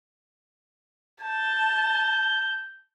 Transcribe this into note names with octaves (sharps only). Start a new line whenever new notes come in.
A5 G6